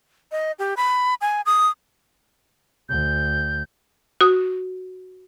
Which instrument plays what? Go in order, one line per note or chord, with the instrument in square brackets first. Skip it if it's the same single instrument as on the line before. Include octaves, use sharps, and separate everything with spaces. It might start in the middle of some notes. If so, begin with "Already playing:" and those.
[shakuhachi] D#5
G4
B5
G#5
D#6
[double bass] D2 [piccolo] G6
[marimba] F#4 D#6